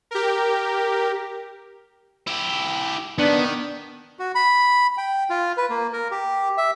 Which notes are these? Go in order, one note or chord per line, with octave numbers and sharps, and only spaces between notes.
G4 A#4
E4 G4
D#3 B3 D4
F#4
B5
G5
F4
B4
A#3
A#4
G4
E5